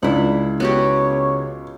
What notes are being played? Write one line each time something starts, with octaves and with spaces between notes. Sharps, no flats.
C#2 D4 E4 F#5
C#3 B3 F#4 G4 C#5